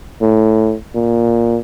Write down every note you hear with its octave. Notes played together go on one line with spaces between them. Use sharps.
A2
A#2